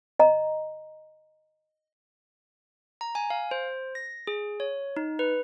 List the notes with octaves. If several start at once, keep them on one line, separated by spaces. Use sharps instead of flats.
D#5 A#5
A#5
G#5
F5
C5
A#6
G#4
C#5
D#4
B4